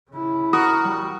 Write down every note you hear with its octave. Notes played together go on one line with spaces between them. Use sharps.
C#3 E4
F#4 A#4 D#6
G3